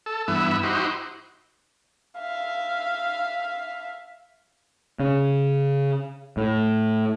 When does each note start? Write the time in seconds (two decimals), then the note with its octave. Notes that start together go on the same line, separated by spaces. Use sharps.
0.06 A4
0.28 G2 E3 B3 E5
0.63 D#4 E4 F#4 G4 C5
2.18 E5 F5
5.00 C#3
6.37 A2